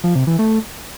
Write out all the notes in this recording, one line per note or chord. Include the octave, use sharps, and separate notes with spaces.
F3
C3
E3
A3